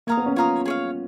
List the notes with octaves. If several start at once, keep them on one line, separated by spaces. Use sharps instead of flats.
A#3 C#5 F5 A#5 D#6
B3
C#4
F4 C#5 F5 A#5 D#6
G#4 C#5 F5